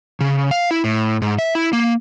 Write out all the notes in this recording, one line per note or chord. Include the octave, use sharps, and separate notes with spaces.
C#3
F5
E4
A2
G#2
E5
E4
A#3